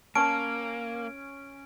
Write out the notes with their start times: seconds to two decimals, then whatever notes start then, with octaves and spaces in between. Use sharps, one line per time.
0.15 A#3 C#4 A5 D7